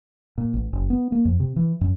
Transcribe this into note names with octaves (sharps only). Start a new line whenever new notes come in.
A#2
A1
F#1
B3
A#3
F2
C3
E3
F#2